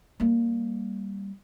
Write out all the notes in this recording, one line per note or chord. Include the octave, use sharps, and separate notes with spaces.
G3 A#3